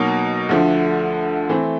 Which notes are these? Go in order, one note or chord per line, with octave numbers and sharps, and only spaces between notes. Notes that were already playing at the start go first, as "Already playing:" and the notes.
Already playing: B2 F#3 A#3 D#4
D2 D3 F3 A3
E3 A3 C4